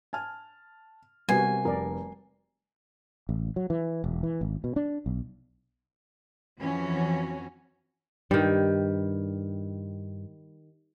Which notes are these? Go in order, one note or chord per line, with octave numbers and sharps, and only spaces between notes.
G#5 A5 F6
C3 G3 B3 F#4 A#4 G#5 C7
F1 A#4 D5
A1
F#3
E3
E1
E3
G#1
B2
D4
B1
F2 E3 F3 C#4 F#4
G2 D#3 G3